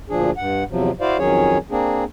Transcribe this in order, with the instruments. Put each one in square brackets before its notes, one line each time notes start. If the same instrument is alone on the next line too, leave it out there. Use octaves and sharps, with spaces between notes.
[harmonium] D2 A#2 F3 D4 G#4
G2 F#5
E2 C3 F3 F#3
E4 F#4 C5 D5 F5
F2 D#3 F#3 C#4 G#4 C#5
A#3 C4 D4 G#4